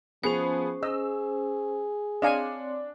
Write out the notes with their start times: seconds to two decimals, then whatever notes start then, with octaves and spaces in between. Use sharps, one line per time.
0.24 F3 B3 C#4 G#4 C5
0.83 G#4 D#5 E6
2.22 C4 D4 C#5 D#5 F5 G#5 C6